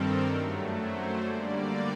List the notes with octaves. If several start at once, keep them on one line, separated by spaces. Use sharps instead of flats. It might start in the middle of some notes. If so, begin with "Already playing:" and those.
Already playing: G2 D#3 G3 C4 A4 A#4
F#2 F#3 A3
C5
D3 G3 A#3 D5